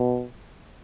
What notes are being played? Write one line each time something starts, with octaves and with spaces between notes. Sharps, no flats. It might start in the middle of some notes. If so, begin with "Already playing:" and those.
Already playing: B2